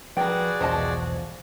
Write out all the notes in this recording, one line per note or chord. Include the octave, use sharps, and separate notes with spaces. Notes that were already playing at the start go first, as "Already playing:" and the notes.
F3 F#4 G#4 A#4 B4 D5 G5
B1 E2 G#2 F3 C5 D#5 A5